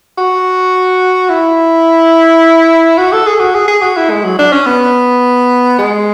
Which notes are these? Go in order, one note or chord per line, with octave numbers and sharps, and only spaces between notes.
F#4
E4
F#4
A4
G#4
F#4
G#4
G#4
F#4
E4
G#3
F#3
D4
C#4
B3
G#3